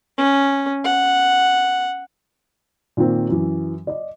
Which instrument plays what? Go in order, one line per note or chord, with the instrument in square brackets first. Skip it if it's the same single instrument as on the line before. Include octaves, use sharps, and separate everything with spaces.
[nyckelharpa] C#4
F#5
[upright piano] A#2 D#3 A#3 C4
F#2 E3
D5 D#5